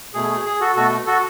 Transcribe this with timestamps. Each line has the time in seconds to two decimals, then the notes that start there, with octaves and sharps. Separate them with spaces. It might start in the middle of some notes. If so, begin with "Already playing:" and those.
0.14 B2 A3 G#4
0.30 G#4
0.46 G#4
0.60 F#4 A4
0.76 B2 A3 F#4 A4
1.06 F#4 A4